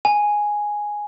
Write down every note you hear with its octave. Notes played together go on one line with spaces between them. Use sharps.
G#5